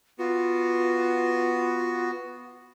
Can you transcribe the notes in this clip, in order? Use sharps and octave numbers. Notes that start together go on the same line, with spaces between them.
B3 F4 F#4